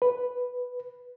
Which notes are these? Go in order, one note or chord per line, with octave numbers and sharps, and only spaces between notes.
B4